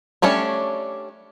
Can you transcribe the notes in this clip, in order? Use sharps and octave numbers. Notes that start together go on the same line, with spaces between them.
G3 A3 C#4 D4 C#5